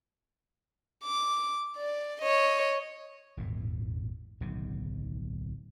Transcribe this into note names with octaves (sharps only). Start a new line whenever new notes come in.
D6
D5
C#5 D#5
D#1 G#1 E2 A2
D1 B1 C3 D#3